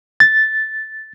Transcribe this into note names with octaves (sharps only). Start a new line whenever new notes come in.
A6